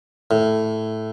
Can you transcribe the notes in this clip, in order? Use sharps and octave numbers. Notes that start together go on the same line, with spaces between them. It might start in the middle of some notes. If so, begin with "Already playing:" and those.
A2